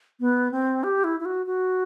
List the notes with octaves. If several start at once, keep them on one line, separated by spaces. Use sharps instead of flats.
B3
C4
G4
E4
E4
F#4
F#4